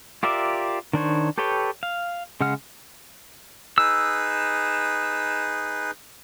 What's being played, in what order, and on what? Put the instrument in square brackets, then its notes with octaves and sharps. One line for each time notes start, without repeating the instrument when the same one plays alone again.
[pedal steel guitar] F4 G4 A#4 D5 E5
D#3 D4 C5 C#5
G4 A4 B4 C#5 G5
F5
C#3 G#3 F#5 F6
[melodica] D#4 G#4 B4 [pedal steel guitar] E6